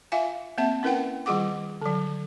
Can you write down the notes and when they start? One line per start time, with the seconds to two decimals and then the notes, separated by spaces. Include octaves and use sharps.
0.12 F4 E5 F5 G#5
0.58 A#3 C4 E5 A5
0.83 C#4 E4 A#4 B4 F#5 G5
1.26 D#3 G3 F4 G#4 F#5 D6
1.81 D3 F#3